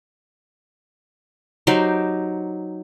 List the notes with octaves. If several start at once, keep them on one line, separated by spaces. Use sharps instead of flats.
F#3 D#4 G4 C5